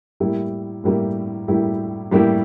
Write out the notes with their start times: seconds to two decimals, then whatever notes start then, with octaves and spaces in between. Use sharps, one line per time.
0.20 A2 G3 A#3 E4 G4
0.84 A2 G3 A#3 E4 G4
1.48 A2 G3 A#3 E4 G4
2.11 A2 G3 A#3 E4 G4